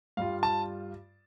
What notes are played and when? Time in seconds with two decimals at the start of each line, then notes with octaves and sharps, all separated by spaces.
0.17 G2 G3 F4 F5
0.43 A5